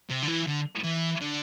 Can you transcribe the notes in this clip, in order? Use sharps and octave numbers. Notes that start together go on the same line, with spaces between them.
C3
D3
E3
D3
E3
D3